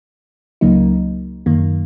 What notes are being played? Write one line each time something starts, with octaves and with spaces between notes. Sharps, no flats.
C#2 C#3 F#3 A#3 D#4
F#2 D#3 A#3